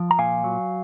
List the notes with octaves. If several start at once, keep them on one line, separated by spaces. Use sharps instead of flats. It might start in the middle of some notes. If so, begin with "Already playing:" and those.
Already playing: F3
A#5
A#2 F5 G#5
F#3